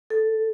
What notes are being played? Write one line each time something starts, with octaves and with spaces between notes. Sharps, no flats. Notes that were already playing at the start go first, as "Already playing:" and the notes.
A4